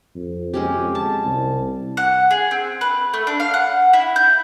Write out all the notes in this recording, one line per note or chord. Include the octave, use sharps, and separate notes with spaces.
F2
G#3 C#4 G4
A5
C2
F#5
G#4
C4
B4
A3
D4
F5
F#5
E4
G6